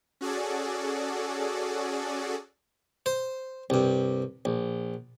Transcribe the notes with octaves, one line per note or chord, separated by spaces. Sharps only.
C#4 F#4 G#4 A4 D5
C5
C2 G2
A#1